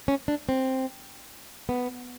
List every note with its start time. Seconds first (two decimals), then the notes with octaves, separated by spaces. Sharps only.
0.08 C#4
0.28 D4
0.49 C4
1.69 B3